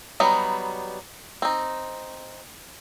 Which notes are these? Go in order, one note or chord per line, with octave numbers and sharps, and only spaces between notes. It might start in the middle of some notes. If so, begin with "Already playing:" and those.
F#3 G3 B3 D#4
C4 D#4